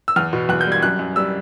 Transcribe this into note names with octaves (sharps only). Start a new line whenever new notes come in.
E6
E2 F6
B2
E2 F#6
G6
G3 G#6
F#2 F#6
F#2
G3 E6